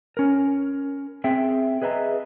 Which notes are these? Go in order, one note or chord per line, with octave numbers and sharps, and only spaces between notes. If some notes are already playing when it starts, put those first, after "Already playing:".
C#4 A#4
C4 G#4 E5 G5
G#4 B4 D#5 E5 A#5